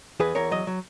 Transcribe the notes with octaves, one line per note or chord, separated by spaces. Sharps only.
E2 G#4 B4
E2 A#4 C#5
F#3 D#5
F#3